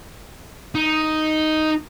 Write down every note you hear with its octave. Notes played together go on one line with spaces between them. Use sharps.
D#4